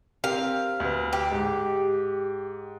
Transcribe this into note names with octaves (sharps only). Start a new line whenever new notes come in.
C4 G4 A#4 F5
D2 B4
G4
G#2